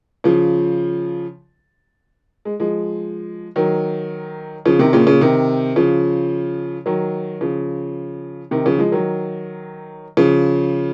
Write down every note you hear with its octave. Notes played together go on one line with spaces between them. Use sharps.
C#3 F3
G#3
F3 G#3
D#3 F#3
C#3 F3
C3 D#3
A#2 C#3
A#2 C#3
C3 D#3
C#3 F3
D#3 F#3
C#3 F3
C3 D#3
C#3 F3
F3 G#3
D#3 F#3
C#3 F3